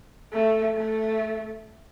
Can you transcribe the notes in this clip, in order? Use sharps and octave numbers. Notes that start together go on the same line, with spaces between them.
A3
A3